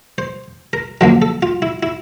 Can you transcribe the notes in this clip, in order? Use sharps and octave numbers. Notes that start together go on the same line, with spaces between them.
C5
A#4
F#2 D3 F3 A#3 A#4
A4
F4
E4
E4